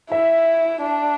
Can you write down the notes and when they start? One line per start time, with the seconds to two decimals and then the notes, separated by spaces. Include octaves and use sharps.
0.11 E4 E5
0.81 D4